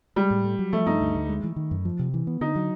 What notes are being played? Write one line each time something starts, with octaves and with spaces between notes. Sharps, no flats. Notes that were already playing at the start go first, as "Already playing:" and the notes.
G3 G#3
A2
A3
F#3
F3 A3
G2 D#4
D2
D2
G#3
E3
D#3
F#2
F3
C3
E3
B3
D3 D#4
F#3